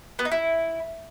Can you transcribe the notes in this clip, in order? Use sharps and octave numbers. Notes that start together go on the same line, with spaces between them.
B3
D#4
E4